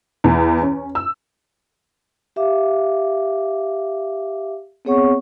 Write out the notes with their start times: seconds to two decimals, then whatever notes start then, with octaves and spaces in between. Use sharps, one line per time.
0.24 E2
0.62 C#4
0.95 E6
2.36 G4 E5 F5 D6
4.85 B3 C4 G#4 C#5 F#5 C#6